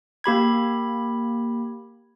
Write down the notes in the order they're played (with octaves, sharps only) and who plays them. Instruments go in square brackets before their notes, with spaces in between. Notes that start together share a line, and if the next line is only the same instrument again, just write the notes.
[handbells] A#3 G4 B5 G#6